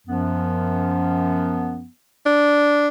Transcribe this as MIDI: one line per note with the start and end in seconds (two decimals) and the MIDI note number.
0.07 1.87 42
0.07 1.87 53
0.07 1.87 59
2.26 2.88 62